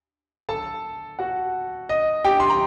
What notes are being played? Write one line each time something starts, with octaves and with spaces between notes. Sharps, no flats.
A4 A5
F#4 F#5
D#5
G4 G5
C6
A#5